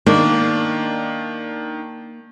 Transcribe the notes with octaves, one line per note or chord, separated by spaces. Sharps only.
D#3 A#3 D4